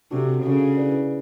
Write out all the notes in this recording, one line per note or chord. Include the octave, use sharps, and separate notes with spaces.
C3 D4 F#4 A4
C#3 D4 F#4 A4
E4 G#4 B4 D5